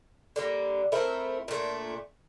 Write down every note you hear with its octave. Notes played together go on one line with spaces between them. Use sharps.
D3 G3 A#3
A3 C4 E4 A#4
A#2 A3 D4